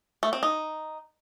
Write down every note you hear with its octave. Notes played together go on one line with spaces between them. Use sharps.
A3
C4
D#4